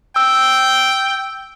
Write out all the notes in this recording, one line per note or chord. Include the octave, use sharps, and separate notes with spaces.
G5 E6